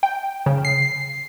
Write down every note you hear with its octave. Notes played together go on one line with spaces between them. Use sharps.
G5
C#3
C7